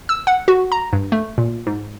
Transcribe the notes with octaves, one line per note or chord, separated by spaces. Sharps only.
E6
F#5
F#4
A#5
G2
A3
A#2
G#2